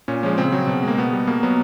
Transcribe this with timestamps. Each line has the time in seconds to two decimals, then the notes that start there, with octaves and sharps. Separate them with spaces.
0.08 A#2 C#4
0.23 F3 G#3 C#4
0.38 C#3 C4
0.52 F#3
0.67 B2
0.83 G#3 A#3
0.98 B2 B3
1.13 G3
1.27 B2 A#3
1.43 F#3 B3